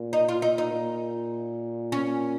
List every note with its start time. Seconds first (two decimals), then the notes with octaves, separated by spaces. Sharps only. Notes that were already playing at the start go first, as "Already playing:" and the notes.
Already playing: A#2
0.13 D#4
0.29 F4
0.42 D#4
0.58 D#4
0.73 A#2
1.92 C#4